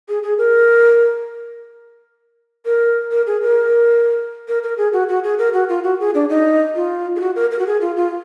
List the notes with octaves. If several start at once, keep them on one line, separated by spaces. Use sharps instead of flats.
G#4
G#4
A#4
A#4
A#4
G#4
A#4
A#4
A#4
G#4
F#4
F#4
G#4
A#4
F#4
F4
F#4
G#4
D4
D#4
F4
G#4
F#4
A#4
A#4
F#4
G#4
F4
F4